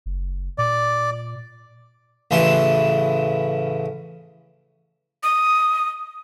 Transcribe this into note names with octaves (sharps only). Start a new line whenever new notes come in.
F#1
A#2 D5
A1 C#3 E3 C6
D#6